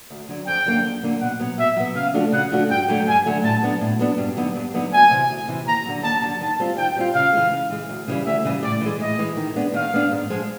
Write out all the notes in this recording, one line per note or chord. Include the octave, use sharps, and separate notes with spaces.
D2
D3 F#3
F2 G5
D3 F#3 A#3 D4
F2
D3 F#3 A#3 D4
B2 F#5
F#3 B3
B2 E5
F#3 B3
C#3 F5
F3 A3 D4 F#4
C#3 F#5
F3 A3 D4 F#4
G2 G5
D3 F#3 A3
G2 G#5
D3 F#3 A3
A2 A5
F#3 B3 D4
A2
F#3 B3 D4
G2
D3 F#3 B3 D#4
G2
D3 F#3 B3 D#4
D2 G#5
C3 E3
D2
C3 E3
D#2 A#5
D3 F#3
D#2 A5
D3 F#3
D#3 A5
G3 C4 F4
D#3 G5
G3 C4 F4
C#3 F5
E3 G#3
C#3
E3 G#3
D2
C#3 E3 G3
D2 E5
C#3 E3 G3
A2 D5
E3 G#3
A2 D#5
E3 G#3
D#3
G#3 B3 D4
D#3 F5
G#3 B3 D4
G#2
F3 G#3